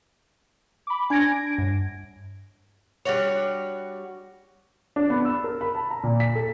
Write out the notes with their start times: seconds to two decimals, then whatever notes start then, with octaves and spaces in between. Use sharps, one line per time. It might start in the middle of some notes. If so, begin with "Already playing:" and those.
0.87 B5 D6
1.10 D4 G#5 G#6 A#6 D7
1.58 G2
3.05 G3 D4 F#4 C#5
4.96 D4
5.10 B3
5.25 E6
5.44 A#4
5.61 B5
5.75 A5
5.91 A#5
6.04 A#2
6.20 B6
6.35 A4